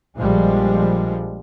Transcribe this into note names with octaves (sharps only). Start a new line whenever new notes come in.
A#1 F3 G3 G#3